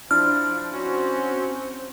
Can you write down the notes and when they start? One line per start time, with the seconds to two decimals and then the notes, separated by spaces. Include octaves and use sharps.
0.11 F3 D4 E4 F6
0.72 C4 C#4 F#4 C5